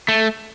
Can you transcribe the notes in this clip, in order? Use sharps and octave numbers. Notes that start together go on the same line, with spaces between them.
A3